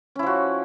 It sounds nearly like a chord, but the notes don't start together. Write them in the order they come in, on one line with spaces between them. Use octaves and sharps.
C#4 E4 F3 F#4